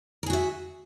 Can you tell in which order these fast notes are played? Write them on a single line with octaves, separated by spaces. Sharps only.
A#4 G#4 F#4 E5